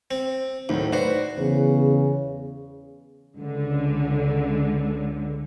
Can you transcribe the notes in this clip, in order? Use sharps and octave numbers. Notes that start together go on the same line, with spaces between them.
C4
D2 A2 D#3 F#3
F#4 B4 C5 D5
E2 C#3
C#2 D3